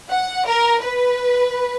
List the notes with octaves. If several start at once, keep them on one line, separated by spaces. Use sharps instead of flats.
F#5
A#4
B4